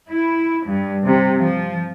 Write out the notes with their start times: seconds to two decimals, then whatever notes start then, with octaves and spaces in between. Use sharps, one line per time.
0.11 E4
0.66 G2
1.05 C3
1.41 F3